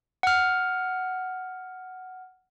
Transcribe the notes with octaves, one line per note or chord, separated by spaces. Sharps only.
F#5 F6